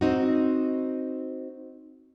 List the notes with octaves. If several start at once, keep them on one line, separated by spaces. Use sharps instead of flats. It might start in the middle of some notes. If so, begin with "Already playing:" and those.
C4 D#4 F#4